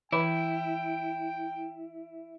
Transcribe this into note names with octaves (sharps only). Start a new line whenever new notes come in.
E3 E4 B4 G5 B5